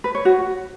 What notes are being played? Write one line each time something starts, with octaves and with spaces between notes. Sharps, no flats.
B4
C#5
F#4